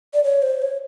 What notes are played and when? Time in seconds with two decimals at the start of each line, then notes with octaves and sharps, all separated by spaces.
0.14 D5
0.24 C#5
0.42 C5
0.62 C#5